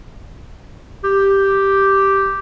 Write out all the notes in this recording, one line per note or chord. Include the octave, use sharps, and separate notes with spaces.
G4